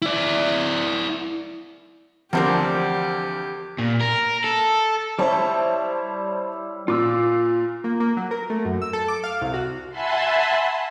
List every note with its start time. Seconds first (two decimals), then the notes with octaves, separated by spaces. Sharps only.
0.02 E4 D5
2.33 D2 E3 F3 C4 D4 G4 A#4 C5
3.78 A#2
4.01 A#4
4.44 A4
5.19 G3 E4 C5 C#5 A5
6.88 A#2 F4 D6 E6
7.84 A#3
8.00 A#3
8.17 F#3
8.31 A#4
8.50 A3
8.65 F#2
8.82 E6
8.93 A4
9.08 D6
9.24 F5
9.41 C2
9.54 F#4
9.90 E5 F#5 G#5 A5 B5 C6